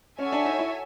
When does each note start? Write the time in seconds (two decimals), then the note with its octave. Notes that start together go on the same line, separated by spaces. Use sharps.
0.19 C#4 F#4 A4 C#5 E5 G#5
0.32 D4
0.45 D#4
0.59 E4